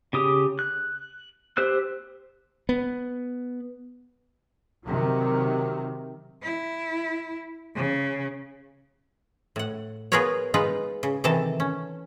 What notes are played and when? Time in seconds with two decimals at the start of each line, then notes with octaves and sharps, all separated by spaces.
0.13 C#3 G4 D#6
0.59 F#6
1.57 G4 C5 E6 F#6
2.69 B3
4.86 C3 D#3 F#3
6.43 E4
7.76 C#3
9.56 A2 F#5
10.12 B3 F4 G#4 A#4 B4 C#5
10.54 G#3 D#4 F4 B4
11.03 C#3
11.24 C3 D#3 E3 A4 A5
11.60 C#4